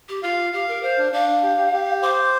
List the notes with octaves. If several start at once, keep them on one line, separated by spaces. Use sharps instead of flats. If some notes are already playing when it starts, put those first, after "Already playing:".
G4
F4 F5
G4 F5
A#4
C5 F5
D4
D4 F5
G4
G4
G4
C5 D6